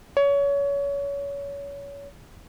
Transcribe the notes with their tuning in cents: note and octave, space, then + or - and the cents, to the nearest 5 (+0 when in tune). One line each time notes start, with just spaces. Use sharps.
C#5 +25